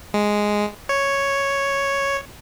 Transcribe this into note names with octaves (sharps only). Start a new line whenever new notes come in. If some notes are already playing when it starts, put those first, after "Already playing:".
G#3
C#5